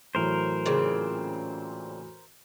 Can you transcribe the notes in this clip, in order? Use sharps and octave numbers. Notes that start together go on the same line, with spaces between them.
A2 E3 F#3 A#4 C5
A#2 C#3 C4